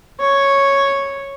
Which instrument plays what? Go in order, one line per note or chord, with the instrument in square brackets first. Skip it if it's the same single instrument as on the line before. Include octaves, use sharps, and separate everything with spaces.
[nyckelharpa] C#5